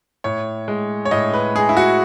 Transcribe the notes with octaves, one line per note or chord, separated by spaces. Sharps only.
A2 C#5
G#3
C#5
A2 D#5
B4
G#3 G#4
E4
F#4